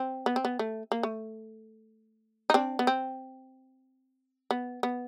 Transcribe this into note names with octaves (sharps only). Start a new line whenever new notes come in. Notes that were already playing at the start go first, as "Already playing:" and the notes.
Already playing: C4
B3
C4
B3
A3
A#3
A3
D#4
C4 D4
B3
C4
B3
B3